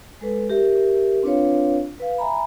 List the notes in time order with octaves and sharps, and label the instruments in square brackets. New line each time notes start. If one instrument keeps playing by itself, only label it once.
[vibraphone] G#3 A4 B4
G4 A#4 E5
C4 D4 F4 B4 C#5 F5
B4 F5
E5 G#5 A#5 B5